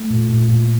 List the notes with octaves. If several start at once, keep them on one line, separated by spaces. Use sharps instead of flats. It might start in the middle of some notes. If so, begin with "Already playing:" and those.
Already playing: A3
A#2
A#2
A#2